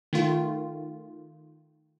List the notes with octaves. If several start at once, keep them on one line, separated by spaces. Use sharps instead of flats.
D#3 A3 F4